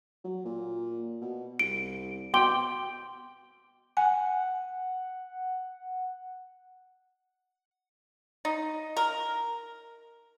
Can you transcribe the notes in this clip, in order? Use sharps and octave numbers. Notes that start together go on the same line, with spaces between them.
F#3
A#2
B2
C2 D7
B2 G5 C6 D6 G7
F#5 G#5
D#4
A#4